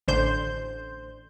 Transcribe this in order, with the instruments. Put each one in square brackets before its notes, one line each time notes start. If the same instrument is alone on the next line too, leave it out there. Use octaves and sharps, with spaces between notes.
[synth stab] A1 D3 C5 G6